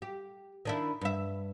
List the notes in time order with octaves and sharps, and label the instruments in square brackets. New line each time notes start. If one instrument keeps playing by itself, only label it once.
[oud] G4
D#3 D4 E4
G2 E5